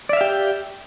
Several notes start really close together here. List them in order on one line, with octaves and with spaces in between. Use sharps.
D5 E5 F5 G4 G5